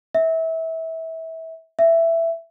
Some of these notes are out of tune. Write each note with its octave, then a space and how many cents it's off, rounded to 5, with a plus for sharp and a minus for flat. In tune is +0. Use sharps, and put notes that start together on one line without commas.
E5 -25
E5 +10